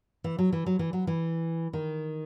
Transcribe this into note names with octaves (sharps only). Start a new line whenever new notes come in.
E3
F#3
E3
F#3
E3
F#3
E3
D#3